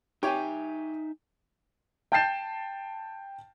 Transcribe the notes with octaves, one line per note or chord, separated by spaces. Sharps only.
D#4 G4 C#5 E5 G#5
G5 A5 G6 A6 C7 E7